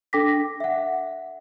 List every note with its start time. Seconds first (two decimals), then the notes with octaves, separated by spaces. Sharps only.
0.13 D4 A4 G5 D6 A#6 B6
0.60 E5 F#5